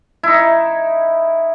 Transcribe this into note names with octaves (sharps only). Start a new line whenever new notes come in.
D#4 E4